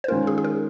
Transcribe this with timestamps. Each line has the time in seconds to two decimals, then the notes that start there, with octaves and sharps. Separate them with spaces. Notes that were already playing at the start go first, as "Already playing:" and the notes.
0.04 C5
0.08 D#3 G#3 C#4 F4 A#4
0.27 G#4
0.38 G#4
0.44 A#4